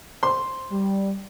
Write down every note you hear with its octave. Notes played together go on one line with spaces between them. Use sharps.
C5 C6
G3